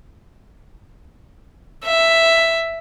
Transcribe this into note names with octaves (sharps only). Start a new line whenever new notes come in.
E5